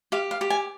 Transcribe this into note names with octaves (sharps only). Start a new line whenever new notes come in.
G4 F5
F5
G4
G#5